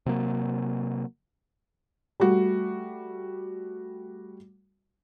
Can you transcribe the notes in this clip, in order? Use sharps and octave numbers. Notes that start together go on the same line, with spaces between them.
C3 F#3 A#3
G3 A3 F#4